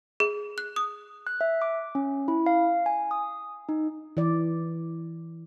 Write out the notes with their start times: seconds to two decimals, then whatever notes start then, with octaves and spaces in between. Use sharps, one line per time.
0.20 G#4
0.58 F#6
0.76 D#6
1.27 F#6
1.41 E5
1.62 D6
1.95 C#4
2.28 E4
2.46 F5
2.86 G#5
3.11 D#6
3.69 D#4
4.17 E3 D5